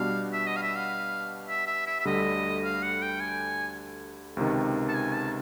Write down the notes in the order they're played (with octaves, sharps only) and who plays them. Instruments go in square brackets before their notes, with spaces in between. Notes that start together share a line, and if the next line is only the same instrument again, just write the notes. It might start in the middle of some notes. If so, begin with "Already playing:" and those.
Already playing: [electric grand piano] B2 G3 B3 D4 F#4 [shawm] F5
[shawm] E5
D#5
F5
E5
F5
E5
E5
E5
E5
[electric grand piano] D2 D3 G3 [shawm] D#5
[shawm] F5
F#5
G5
G#5
[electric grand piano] C#2 C3 D#3
[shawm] A5
G#5
A5